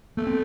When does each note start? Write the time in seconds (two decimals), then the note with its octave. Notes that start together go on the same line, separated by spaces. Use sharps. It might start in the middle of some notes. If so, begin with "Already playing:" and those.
0.17 A3 A#3
0.27 C4